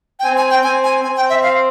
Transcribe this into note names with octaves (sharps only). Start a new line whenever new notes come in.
G5
C4 G#5
G#5
G5
C4 G#5
G#5
C4 G#5
G5
E5
F5